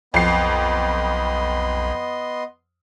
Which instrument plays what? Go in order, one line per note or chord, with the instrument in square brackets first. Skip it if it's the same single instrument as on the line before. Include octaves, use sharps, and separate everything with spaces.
[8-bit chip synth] B1 [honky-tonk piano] F2 C7 [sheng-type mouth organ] B3 D#5 C6